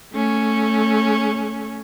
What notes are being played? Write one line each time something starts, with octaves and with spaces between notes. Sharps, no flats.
A3 C#4